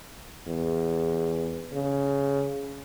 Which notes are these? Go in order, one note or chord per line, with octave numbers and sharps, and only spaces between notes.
E2
C#3